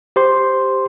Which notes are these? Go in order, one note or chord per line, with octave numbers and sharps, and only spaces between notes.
G4 C5 C6